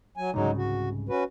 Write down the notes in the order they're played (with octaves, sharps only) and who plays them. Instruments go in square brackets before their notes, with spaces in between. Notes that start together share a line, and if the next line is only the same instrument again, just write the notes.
[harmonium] F#3 G#5
[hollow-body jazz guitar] C2 G#2 C#3 [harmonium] F#3 G#3 D#4
[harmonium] F#4
C#4 F#4 B4